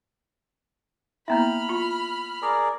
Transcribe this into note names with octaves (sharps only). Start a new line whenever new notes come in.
A#3 B3 E4 E5 A#5 B5 F6
F4 C#6
G#4 A#4 D5